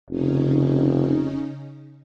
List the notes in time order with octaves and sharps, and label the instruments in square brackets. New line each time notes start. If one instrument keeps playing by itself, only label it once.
[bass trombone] F1 [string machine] C#3 C#4 D#4